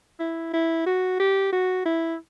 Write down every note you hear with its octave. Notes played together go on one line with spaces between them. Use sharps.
E4
E4
F#4
G4
F#4
E4